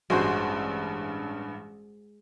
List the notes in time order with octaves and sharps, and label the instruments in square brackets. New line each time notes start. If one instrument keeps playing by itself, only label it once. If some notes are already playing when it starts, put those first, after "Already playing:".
[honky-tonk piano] A1 G2 [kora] G#3 F#4 C5